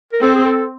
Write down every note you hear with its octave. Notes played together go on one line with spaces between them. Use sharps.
A#4
C4 A4
G#4
A4